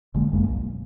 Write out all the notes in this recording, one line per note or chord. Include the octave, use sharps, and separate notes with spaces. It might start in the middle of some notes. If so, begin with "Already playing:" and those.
G1 D3 G#3 A#3
G1 F#2 G#3 A#3
B1